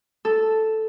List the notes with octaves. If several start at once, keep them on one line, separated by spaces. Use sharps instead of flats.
A4